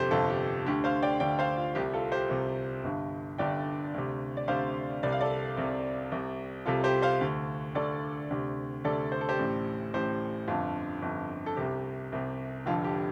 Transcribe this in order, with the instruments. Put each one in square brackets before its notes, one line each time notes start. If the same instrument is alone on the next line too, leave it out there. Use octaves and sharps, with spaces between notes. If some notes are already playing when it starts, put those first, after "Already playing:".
Already playing: [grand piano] G1 F2 C3 G4 A4 C5
G1 F2 C3 F4 A4
G4
D2 D3 G4
C5 F5
D5 G5
D2 D3 D5 G5
C5 F5
F4
C2 C3 G4
F4 A4
G4 C5
C2 C3
G1 G2 D3
G1 G2 D3 D5 G5
D2 C3
D5
D2 C3 C5 F5
C2 C3 D5
F5
A4 D5
C2 C3
C2 C3
C2 C3 F4 A4
G4 C5
C5 F5
D2 D3
D2 D3 A4 D5
D2 C3
D2 C3 A4 D5
C5
A4
G4 C5
A1 A2
A1 A2 G4 C5
G1 F2 D3 F4
G1 F2 D3
A4
C2 C3 G4
C2 C3
F1 F2 D3 F4
G4